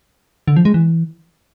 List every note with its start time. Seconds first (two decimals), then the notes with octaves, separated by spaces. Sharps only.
0.48 D3
0.56 F3
0.65 G#3
0.74 E3